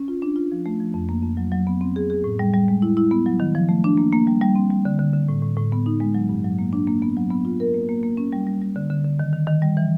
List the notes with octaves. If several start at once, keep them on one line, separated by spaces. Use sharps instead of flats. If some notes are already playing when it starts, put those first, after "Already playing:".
Already playing: C#4
F4
D4
F4
F3
A3
F3
F2
A#3
F2
F#3
F#3
B3
C4
G#4
G#4
A2
G3
G3
G#3
E4
E4
B3
F#3
D#3
F3
A3
D4
A#3
A#3
G3
G3
C4
G3
D3
D3
D3
A2
A2
A2
B3
D#4
G#3
F#3
G2
F#3
A#3
D4
A#3
B3
F#3
B3
F4
A#4
A#3
A#3
A#3
C#4
G3
G3
G3
D3
D3
D3
D#3
D#3
D#3
G3
E3